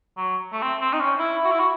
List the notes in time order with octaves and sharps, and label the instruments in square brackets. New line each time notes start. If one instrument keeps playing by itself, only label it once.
[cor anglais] F#3
A3
C4
C4
D#4
C#4
E4
F#4
E4
F#4